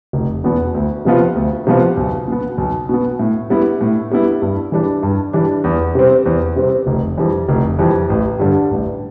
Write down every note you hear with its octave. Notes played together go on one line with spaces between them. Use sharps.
F1
E2 B2 B3
D2
C3 F3 B3 F4
D2
C3 F3 B3 F4
B1
B2 B3
B1
B2 B3
A2
G3 B3 E4
A2
G3 B3 E4
G2
E3 G3 D4
G2
E3 G3 D4
E2
C3 G3 C4
E2
C3 G3 C4
F1
F2 E3 G3
F1
F2 E3 G3
A1
G2 D3 G3
A1